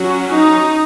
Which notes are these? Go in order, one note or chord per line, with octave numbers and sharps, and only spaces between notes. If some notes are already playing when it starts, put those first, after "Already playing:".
Already playing: F#3 C#4 F#4
D#4